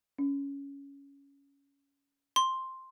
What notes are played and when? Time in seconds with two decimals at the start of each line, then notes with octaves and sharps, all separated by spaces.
0.19 C#4
2.36 C6